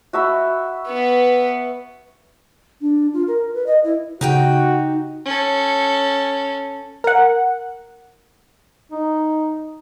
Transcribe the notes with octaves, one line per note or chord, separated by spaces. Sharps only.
F#4 E5 B5
B3 B4
D4
F4
A#4
B4
D#5
E4
C#3 D#4 F#4 G4 G5
C#4 A4
A#4 F#5
D#4